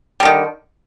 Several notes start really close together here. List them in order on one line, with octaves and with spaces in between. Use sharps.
G3 D3 D#3